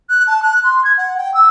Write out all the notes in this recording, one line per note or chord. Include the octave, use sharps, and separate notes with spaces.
F#6
A5
F#6
C6
G#6
F#5
G5
E6